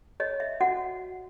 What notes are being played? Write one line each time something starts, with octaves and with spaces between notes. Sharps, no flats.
C#5 D#5
E5
F#4 F#5